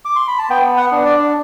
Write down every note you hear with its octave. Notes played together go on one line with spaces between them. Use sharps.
D6
C6
B5
A5
B3 G5
F#5
D4
D5